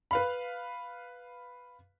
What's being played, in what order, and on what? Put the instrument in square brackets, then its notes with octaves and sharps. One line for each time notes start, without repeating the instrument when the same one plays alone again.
[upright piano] B4 F5 B5